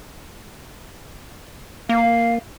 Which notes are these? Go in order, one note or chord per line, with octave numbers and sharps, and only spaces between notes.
A#3 F5